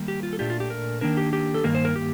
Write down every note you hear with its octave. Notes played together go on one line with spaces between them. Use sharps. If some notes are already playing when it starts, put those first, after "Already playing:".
Already playing: D#3 G3 A#3
G4
F4
A4
A#2 A3 D4 F4 G4
F4
G4
A#4
D#3 A#3 D4 A#4
G4
G4
A4
G2 D#3 A#3 A#4
C5
A#4
G4